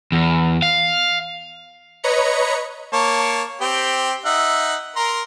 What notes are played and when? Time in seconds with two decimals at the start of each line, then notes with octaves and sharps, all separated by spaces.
0.12 E2
0.62 F5
2.03 B4 C#5 D#5 A#5 B5 C#7
2.93 A#3 C#5 A5
3.61 C4 G4
4.25 D#4 E5 F#5
4.96 A#4 A#5 C6